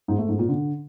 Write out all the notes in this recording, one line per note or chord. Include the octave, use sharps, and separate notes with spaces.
G#2
A3
G#2
A#2
D3